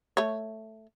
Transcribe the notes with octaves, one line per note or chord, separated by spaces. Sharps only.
A3 C#5